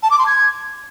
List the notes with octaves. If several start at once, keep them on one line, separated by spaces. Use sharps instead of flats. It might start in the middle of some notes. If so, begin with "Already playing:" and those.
A5
D6
C6
G#6